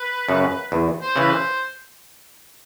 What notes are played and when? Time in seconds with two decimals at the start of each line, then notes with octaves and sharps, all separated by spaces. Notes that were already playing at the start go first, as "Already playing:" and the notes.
Already playing: B4
0.29 F#2 C#3
0.72 E2
1.01 C5
1.16 C#3 E3 B4
1.30 C5